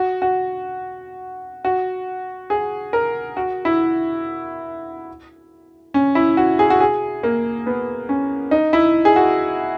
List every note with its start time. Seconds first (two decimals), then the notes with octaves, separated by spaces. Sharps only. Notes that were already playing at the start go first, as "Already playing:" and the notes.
Already playing: F#4
0.22 F#4
1.65 F#4
2.50 G#4
2.93 A#4
3.37 F#4
3.65 E4
5.94 C#4
6.15 E4
6.37 F#4
6.59 G#4
6.70 F#4
6.80 G#4
7.23 A#3
7.66 B3
8.09 C#4
8.51 D#4
8.73 E4
9.05 G#4
9.16 F#4